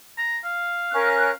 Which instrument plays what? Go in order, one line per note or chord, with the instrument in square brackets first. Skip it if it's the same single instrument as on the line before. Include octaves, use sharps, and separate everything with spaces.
[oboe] A#5
F5
[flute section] C#4 A#4 F#6